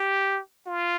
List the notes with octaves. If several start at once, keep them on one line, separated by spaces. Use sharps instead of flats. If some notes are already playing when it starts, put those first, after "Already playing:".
Already playing: G4
F4